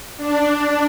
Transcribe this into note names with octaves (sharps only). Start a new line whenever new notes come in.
D4